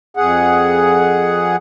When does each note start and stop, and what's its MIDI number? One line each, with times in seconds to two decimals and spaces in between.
0.17 1.56 41
0.17 1.56 68
0.17 1.56 78